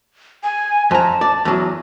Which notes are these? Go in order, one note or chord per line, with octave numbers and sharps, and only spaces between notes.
G#5
F2 A5 A#5
D5
E2 F#3